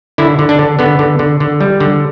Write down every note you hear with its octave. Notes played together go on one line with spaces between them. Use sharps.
D3 E4
D3
D4
D3
D3 B3
D3
D3
D3
G3
D3